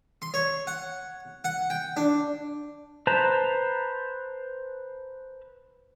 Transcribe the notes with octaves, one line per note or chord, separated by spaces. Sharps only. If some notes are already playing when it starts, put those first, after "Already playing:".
C6
C#5
F#5
F#5
G5
D4
B4 C5 A5 A#5